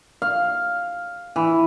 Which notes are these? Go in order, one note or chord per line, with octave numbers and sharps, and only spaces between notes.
F5
E3